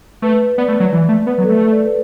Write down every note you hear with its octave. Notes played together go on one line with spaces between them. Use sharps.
A3 B4
B3 D5
A3
F#3
E3
A3
B3 B4
F#3
A4
A3
A4
D5
B4